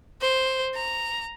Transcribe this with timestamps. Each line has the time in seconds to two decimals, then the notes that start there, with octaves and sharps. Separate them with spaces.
0.21 C5
0.75 A#5